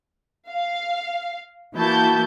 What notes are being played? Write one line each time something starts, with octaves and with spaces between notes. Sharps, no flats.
F5
E3 A#3 E4 F#4 A5 G6